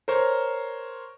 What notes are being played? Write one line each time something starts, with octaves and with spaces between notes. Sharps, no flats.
A#4 C5 C#5